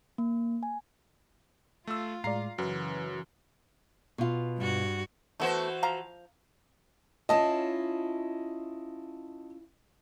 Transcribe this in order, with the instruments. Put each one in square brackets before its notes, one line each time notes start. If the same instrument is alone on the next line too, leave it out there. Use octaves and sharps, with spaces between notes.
[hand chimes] A#3
G#5
[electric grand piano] A3 E6 [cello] F4
[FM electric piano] A2 G#3 D5 [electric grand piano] F5 A#5 C7
[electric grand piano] F#2 [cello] C#3 E3 [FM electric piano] F#4 B4
[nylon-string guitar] B2 F4
[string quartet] G2 F#4
[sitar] E3 F#4 C5 [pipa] A3 B3
[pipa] F3 F5 A#5
[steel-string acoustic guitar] C#4 E4 F4 [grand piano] D#5 A5